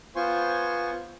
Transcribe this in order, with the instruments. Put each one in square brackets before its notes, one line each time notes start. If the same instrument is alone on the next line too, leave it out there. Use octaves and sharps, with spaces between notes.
[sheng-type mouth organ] B3 F4 C5 G#5 C6 C#6